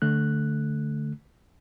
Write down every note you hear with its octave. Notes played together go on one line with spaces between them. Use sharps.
D3 A3 F#6